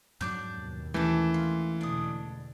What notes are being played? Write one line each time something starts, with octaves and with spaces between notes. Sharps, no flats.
F2 G#2 F#3 D4 D6 G6
D#2 B2
E3 G#3 A3 C#4 G4 A5
F4
E2 B2 D3 D4 D#6